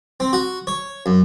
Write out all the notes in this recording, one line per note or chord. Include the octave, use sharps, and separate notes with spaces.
C4
F#4
C#5
F#2